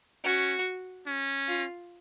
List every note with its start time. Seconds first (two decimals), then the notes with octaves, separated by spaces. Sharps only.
0.24 C#4 F#4
1.07 C#4
1.48 F4